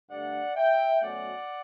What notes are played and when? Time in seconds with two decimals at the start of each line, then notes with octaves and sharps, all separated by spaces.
0.11 G2 D3 A3 D5 F#5
0.56 E5 G5
1.02 B2 F#3 A3 C#4 D5 F#5